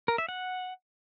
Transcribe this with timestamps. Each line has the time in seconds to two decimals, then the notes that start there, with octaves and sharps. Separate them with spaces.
0.08 A#4
0.18 E5
0.29 F#5